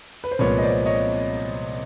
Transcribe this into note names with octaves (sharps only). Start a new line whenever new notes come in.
B4
C5
C2 A#2 F3 G#3 B3 B4 C#5
D#5
C5 D5
C#5 D#5